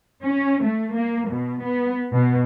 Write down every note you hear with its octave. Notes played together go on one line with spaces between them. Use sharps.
C#4
A3
A#3
B2
B3
B2